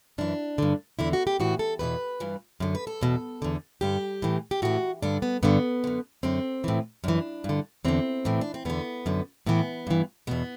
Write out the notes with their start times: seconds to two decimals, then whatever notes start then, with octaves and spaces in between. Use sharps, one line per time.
0.18 F#2 E3 D4
0.58 G2 D3
0.99 E2 D3 E4
1.13 F#4
1.27 G4
1.40 A2 E3 F#4
1.59 A4
1.79 E2 B2 B4
2.20 G2 E3
2.60 F#2 D3
2.75 B4
2.87 A4
3.01 E2 B2
3.42 E2 D3
3.81 G2 D3 G4
4.22 A2 E3
4.51 G4
4.62 A2 E3 F#4
5.02 G2 D3 D4
5.22 B3
5.43 G2 D3 B3
5.84 F#2 D3
6.23 F#2 D3 C4
6.64 A2 E3
7.04 F#2 E3 D4
7.44 G2 D3
7.85 E2 D3 C4
8.25 A2 E3
8.41 D4
8.54 C4
8.65 E2 D3 B3
9.06 F#2 D3
9.46 A2 E3 B3
9.87 G2 E3
10.27 E2 B2 B3